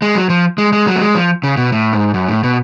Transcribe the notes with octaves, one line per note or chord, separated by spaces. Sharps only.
G#3
F#3
F3
G#3
G#3
F#3
A3
G#3
F3
C#3
B2
A2
G#2
F#2
A2
B2